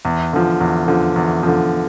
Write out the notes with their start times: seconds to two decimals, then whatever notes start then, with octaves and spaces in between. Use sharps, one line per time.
0.05 E2
0.33 D3 F3
0.61 E2
0.88 D3 F3
1.16 E2
1.43 D3 F3